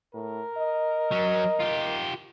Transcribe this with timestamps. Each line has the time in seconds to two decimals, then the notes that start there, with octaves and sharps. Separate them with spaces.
0.14 A2 A#4
0.58 D#5
1.12 F#3 C#4
1.60 F4 G4